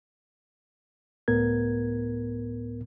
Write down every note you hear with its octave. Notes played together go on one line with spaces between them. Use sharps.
C#2 A2 B3 A#4 G#6